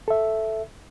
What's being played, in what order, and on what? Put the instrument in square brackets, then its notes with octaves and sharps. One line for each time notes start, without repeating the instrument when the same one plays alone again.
[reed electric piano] A4 E5